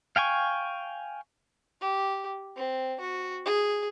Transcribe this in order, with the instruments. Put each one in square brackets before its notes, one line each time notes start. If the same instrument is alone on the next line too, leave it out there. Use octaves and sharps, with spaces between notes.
[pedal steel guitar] F5 G5 G#5 C#6
[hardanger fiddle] G4
C4
F#4
G#4